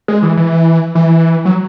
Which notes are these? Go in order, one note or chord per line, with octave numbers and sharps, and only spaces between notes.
G#3
E3
E3
E3
F#3